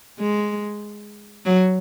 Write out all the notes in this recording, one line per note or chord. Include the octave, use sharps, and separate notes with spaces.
G#3
F#3